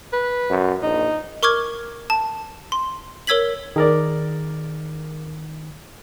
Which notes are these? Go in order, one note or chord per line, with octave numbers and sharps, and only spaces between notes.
B4
F#2
A#1 D#4
A#4 C#6 D6 F6 G#6
A5
C6
A#4 C#5 E6 G#6 B6 F#7
D#3 G#4 A#4 D5